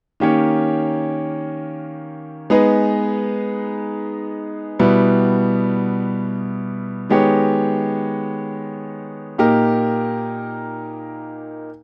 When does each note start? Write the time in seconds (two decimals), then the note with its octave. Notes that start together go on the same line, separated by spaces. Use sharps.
0.20 D#3 A#3 C#4 G4 C#5
2.50 G#3 B3 D#4 G#4 B4
4.80 B2 G3 B3 E4
7.10 D#3 G#3 B3 G4 C#5
9.38 A#2 A#3 D#4 G4 A#4